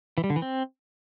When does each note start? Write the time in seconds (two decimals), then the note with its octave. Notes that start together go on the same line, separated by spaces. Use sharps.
0.18 E3
0.24 G3
0.30 D3
0.36 E3
0.42 C4